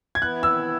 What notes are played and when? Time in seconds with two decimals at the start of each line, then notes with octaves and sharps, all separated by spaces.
0.15 G#6
0.22 E3 B3 E4 F#6
0.43 E6